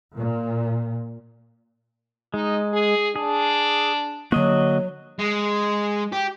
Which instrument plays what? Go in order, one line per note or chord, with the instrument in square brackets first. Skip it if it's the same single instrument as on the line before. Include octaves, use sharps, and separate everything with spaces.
[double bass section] A#2
[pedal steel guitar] G#3 [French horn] D#4
[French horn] G#4
[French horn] D4 [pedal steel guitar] G#4
[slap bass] D3 A#3 [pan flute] F#3 [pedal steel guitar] F#4 D#5
[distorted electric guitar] G#3
G4